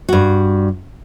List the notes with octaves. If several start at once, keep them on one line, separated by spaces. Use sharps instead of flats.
G2 F#4